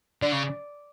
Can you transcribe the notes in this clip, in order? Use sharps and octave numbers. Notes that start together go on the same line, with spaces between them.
D3 D5
C#3